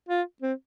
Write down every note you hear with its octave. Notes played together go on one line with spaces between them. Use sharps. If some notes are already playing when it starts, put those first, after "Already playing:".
F4
C4